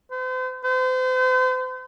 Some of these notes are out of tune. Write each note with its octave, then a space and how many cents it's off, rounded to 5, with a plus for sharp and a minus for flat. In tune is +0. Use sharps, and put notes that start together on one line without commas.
C5 -40
C5 -40